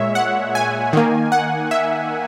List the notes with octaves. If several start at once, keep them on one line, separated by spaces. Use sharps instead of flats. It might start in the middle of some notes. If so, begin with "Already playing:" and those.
Already playing: A#2 G#3 C#5 E5
F#5
G#5
D#3 A#3
F#5
E5